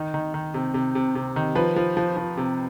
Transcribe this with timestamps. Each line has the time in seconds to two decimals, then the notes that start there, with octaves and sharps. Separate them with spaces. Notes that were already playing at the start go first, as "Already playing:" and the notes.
Already playing: D#3 D#4
0.14 D#3
0.34 D#3
0.54 C3
0.74 C3
0.95 C3
1.15 C3
1.36 D#3
1.55 F3 B4
1.76 F3
1.97 F3
2.17 F3
2.37 C3